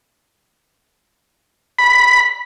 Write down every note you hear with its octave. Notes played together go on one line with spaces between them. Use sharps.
B5